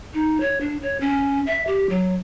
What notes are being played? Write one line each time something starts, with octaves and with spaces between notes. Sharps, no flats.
D#4
C#5
D4
C#5
C#4
E5
G4
F#3